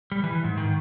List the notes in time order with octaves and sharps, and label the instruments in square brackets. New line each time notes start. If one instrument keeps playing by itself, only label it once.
[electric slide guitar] G3
E3
G#2
D#3